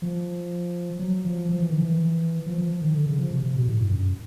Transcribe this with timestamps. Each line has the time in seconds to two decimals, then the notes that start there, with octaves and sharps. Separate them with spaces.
0.02 F3
0.99 F#3
1.25 F3
1.49 F3
1.60 E3
1.69 D#3
1.81 E3
2.46 F3
2.58 F3
2.82 D#3
2.94 D3
3.06 C#3
3.19 F3
3.31 C3
3.43 C3
3.56 B2
3.68 A2
3.81 G2
3.92 F#2